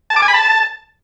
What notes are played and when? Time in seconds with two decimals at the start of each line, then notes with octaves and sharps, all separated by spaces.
0.10 A5
0.16 D6
0.22 G#5
0.28 B5
0.34 A5